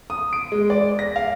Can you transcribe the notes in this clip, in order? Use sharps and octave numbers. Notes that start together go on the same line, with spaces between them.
D#6
D7
G#3
D5
A#6
F5